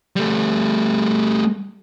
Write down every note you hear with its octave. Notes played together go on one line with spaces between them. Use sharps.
G3 A3